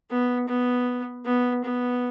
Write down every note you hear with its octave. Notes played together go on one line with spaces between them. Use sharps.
B3
B3
B3
B3